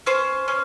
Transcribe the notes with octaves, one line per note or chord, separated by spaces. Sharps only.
C#4 C5
C#4